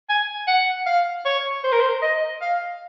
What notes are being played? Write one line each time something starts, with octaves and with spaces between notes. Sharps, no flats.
G#5
F#5
F5
C#5
C5
A#4
C5
D#5
F5